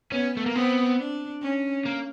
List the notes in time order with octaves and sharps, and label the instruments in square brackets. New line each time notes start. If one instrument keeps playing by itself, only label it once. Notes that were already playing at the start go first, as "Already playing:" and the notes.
[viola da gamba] B3 [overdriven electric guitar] C#4
[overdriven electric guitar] A3
A#3
[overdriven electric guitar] B3 [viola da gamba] C4
[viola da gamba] D4
C#4
[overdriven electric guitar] A#3